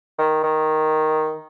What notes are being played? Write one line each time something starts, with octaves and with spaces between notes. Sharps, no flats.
D#3
D#3